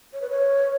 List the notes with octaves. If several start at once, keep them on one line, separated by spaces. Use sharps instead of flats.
C#5
B4
C#5